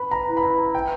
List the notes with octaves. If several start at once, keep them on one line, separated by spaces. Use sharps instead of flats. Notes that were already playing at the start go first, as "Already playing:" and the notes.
Already playing: B4 B5
A#5
E4
B5
A#5
B4 G5